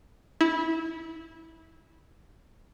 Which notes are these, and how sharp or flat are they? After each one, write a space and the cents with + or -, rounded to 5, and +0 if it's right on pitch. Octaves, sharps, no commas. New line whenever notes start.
E4 -20